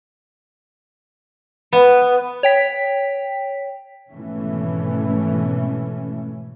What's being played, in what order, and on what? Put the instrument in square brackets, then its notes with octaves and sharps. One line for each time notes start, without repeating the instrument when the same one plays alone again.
[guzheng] B3
[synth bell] C#5 G5 B6
[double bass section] G#1 B2 E3 A3 C#4